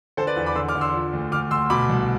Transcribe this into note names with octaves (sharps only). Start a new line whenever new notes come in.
D3 A4 C5
B4 D5
E2
B5 D6
D3 C6 E6
D6 F6
D3
C6 E6
F3
D2
D2 D6 F6
D2 C6 E6
B2 B5 D6
C2